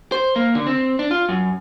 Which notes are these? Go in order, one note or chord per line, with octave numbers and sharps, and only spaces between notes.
C5
A#3
D3
C4
D4
F4
F#2